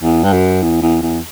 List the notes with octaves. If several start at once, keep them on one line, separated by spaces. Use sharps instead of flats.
E2
G2
F#2
E2
E2
E2